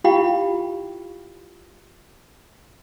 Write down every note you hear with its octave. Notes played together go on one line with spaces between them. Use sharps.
E4 F4 G4 F5 G5 B5